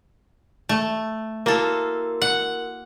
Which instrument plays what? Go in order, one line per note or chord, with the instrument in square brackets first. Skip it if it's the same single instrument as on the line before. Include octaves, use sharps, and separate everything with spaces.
[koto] A3
[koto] A#3 A4 [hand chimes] E4 F#4 A#4
[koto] F#5